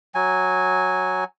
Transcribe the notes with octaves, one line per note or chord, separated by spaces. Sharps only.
F#3 G#5